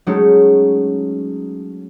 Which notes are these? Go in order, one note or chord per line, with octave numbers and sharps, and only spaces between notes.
F#3 G#3 A3 C#4 D#4